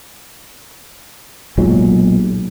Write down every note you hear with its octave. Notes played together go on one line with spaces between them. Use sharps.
B1 A#2 F#3 G#3